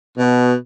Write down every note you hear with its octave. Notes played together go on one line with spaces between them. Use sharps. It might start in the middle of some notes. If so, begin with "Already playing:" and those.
B2